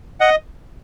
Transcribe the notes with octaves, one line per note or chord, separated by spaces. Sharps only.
D#5 F#5